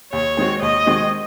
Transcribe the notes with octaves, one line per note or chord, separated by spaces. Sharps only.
D#2 C#5
D#3 G#3 C4 F#4
D#2 D#5
D#3 G#3 C4 F#4